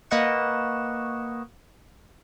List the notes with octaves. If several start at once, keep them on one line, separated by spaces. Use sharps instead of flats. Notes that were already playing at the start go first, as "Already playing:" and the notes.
A#3 B4 D#5 F#5 C#6 E7